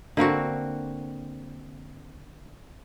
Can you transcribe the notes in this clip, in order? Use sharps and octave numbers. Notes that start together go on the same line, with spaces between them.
D3 A#3 C4 F#4